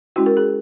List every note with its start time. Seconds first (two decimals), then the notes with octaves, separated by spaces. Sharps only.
0.16 G#3 C#4 E4 F#4
0.26 A#4
0.37 G#4